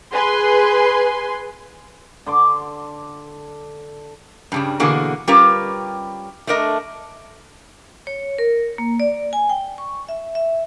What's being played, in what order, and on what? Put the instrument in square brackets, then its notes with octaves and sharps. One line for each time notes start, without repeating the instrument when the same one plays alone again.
[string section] G#4 B4 G#5 C6
[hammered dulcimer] D3 C6 D6
[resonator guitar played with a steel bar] G2 C#3 G3
B2 D3 E3 A#3 F#4 G#4
G3 C#4 F4 G4 A#4 B4
A3 D4 A#4 D#5
[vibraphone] C#5
A#4
A#3
D5
G#5
G5
C#6
E5
E5